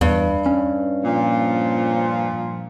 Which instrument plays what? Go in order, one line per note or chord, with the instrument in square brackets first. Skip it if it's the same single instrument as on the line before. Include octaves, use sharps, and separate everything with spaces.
[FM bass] E2 [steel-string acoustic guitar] G2
[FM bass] C#4
[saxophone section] A#2 F3